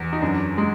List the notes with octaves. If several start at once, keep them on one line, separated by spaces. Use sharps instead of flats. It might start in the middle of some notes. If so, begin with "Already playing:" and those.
Already playing: E2
D#4
F#2 D4
G#3